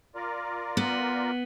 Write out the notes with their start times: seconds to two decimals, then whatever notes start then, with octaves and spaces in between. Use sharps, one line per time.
0.15 F4 A#4 D5
0.77 B3